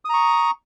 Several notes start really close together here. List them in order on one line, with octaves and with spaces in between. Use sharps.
D#6 A#5 C#6